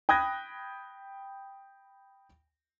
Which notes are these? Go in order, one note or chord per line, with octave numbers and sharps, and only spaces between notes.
G5 B5 D#6 F#6 G#6 A#6